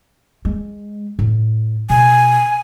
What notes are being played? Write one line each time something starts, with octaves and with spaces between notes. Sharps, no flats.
G#3
A2
B2 G#5